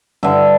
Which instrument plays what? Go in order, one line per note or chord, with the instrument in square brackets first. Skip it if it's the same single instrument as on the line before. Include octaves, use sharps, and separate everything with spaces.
[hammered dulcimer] G2 D3 E5